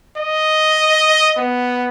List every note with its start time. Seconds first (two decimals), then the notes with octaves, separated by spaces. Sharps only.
0.17 D#5
1.38 B3